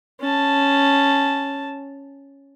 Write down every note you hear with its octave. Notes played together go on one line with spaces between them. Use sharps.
C#4 A5